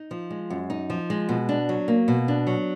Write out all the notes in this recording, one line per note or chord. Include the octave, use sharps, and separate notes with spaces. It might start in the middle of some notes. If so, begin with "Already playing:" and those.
Already playing: D#4
F3
G#3
F#2
D#4
F3
G#3
B2
D4
F#3
A#3
B2
D4
F#3